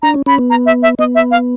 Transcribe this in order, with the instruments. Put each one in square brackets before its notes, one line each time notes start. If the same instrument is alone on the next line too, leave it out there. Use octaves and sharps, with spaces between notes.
[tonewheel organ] D4 [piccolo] A#5
[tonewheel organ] C#4
[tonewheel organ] C#4 [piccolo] B5
[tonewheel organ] B3
[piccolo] A#5
E5
E5
[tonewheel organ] B3 [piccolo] D#5
[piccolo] E5
F5